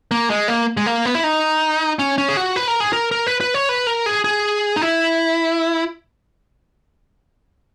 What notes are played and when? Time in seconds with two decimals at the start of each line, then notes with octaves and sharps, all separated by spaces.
0.11 A#3
0.30 G#3
0.48 A#3
0.77 G#3
0.86 A#3
1.05 B3
1.15 E4
1.24 D#4
1.99 C#4
2.18 C#4
2.28 G#4
2.37 F#4
2.56 B4
2.68 A#4
2.80 G#4
2.93 A#4
3.12 A#4
3.27 B4
3.41 B4
3.54 C#5
3.69 B4
3.87 A#4
4.06 G#4
4.24 G#4
4.76 D#4
4.82 E4